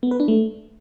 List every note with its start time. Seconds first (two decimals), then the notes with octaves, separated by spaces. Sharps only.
0.03 B3
0.11 B4
0.20 D4
0.28 A3